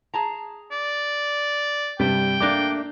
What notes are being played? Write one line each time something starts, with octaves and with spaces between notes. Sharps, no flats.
G#4 A5 A#5
D5
G2 C3 G3 G5
A3 A#3 D4 D5 D6